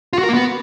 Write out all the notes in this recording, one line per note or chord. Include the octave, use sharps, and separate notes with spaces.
F4
F#4
A#4
A#3
B3